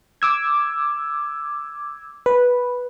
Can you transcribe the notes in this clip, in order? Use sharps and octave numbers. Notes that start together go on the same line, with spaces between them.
D6 E6 G#6
B4